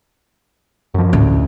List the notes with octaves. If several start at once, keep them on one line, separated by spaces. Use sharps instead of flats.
F#2 F3
A1 D2